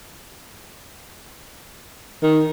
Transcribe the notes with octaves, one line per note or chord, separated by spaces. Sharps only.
D#3